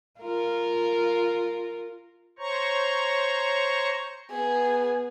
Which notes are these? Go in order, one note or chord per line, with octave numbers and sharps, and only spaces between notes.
F4 A#4
C5 C#5 A#5 C#6
B3 G#4